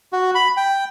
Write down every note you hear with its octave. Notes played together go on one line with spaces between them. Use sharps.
F#4
B5
G5